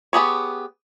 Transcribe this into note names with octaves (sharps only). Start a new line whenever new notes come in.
B3 G4 G#4 C#5